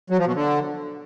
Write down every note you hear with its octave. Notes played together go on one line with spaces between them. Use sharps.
F#3
F3
B2
D3